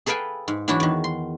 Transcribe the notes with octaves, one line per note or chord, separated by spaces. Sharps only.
G#4 A4 B4 F5 G5 G#5
G#2
E3 F#3 D4 E4 F#4
E2 D#3
C6